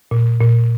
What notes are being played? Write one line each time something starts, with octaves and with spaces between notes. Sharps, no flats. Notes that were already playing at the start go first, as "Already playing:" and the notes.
A#2
A#2